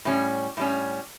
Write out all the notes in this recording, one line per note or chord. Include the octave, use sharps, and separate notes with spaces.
A2 G3 C#4
A2 G3 C#4